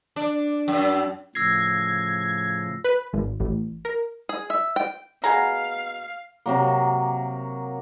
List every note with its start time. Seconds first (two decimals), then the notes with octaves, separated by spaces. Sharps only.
0.16 D4
0.68 F#2
1.35 A2 C#3 F3 E6 G#6 A#6 C7
2.84 B4
3.13 G#1
3.40 A1
3.85 A#4
4.29 G#4
4.50 E5
4.76 G5
5.24 B2 G#4 F5 A#5
6.46 C3 F#3 A#3